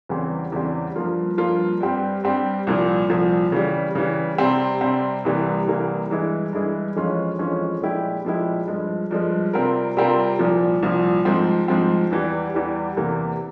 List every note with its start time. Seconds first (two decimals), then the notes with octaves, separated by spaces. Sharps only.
0.09 E2 C#3 E3 G3 C4
0.52 E2 C#3 E3 G3 C4
0.96 G2 F3 A#3 F4
1.37 G2 F3 A#3 F4
1.80 G2 G3 C4 G4
2.23 G2 G3 C4 G4
2.67 C2 A#2 F3
3.10 C2 A#2 F3
3.52 C#3 E3 G3
3.95 C#3 E3 G3
4.38 C3 G3 C4
4.81 C3 G3 C4
5.25 C2 C3 E3 G3 A#3
5.67 C2 C3 E3 G3 A#3
6.10 G2 E3 G#3 E4 G#4
6.53 G2 E3 G#3 E4 G#4
6.96 F2 E3 G#3 C#4 F4
7.39 F2 E3 G#3 C#4 F4
7.82 A#2 F3 G#3 E4 G4
8.24 A#2 F3 G#3 E4 G4
8.67 G2 F3 G#3
9.11 G2 F3 G#3
9.53 C3 G3 C4 F4 A#4
9.97 C3 G3 C4 F4 A#4
10.39 C2 A#2 F3
10.83 C2 A#2 F3
11.25 G#2 F3 C4
11.68 G#2 F3 C4
12.11 E2 E3 G3
12.54 E2 E3 G3
12.97 E2 C3 E3 A#3